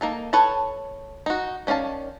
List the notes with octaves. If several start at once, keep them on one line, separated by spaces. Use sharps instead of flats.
A#3 D#4 A4
A4 B4 C#5 A5
D#4 F#4
D#3 C#4 D5 F5 A5